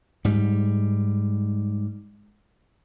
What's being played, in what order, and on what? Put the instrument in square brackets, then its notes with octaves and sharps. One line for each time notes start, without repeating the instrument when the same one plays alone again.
[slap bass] G#2 G3